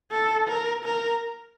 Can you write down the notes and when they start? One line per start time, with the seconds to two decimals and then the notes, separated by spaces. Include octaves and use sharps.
0.11 A4
0.48 A#4
0.84 A#4